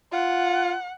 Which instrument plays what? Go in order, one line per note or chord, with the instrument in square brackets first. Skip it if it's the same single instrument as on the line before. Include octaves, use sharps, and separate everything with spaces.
[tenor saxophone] F4 [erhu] F#5